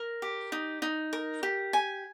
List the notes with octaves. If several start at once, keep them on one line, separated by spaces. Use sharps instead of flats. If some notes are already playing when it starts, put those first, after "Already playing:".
Already playing: A#4
G4
D#4
D#4
A#4
G4
G#5